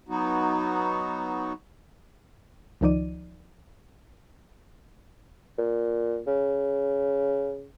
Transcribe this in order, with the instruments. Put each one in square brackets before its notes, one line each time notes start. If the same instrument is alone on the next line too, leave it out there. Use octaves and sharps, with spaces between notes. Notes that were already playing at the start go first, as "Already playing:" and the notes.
[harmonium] F#3 B3 D#4 F#4
[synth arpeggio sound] C#2 D#3 F3 D#4 D5 D#7
[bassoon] A#2
C#3